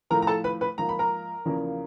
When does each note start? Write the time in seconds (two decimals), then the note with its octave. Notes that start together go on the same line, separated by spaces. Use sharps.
0.10 A2 F3 A3 A#4 A#5
0.22 A#5
0.27 A4 A5
0.44 B4 B5
0.61 B4 B5
0.78 G#2 F3 A#3 A#5
0.89 B5
0.99 A#4 A#5
1.45 E2 C#3 F3 A#3